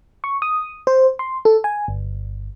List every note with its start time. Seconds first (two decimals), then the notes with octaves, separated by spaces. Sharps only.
0.24 C#6
0.42 D#6
0.87 C5
1.19 C6
1.45 A4
1.64 G#5
1.88 G1